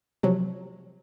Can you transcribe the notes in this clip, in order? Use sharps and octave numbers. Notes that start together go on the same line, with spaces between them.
C3 F3 F#3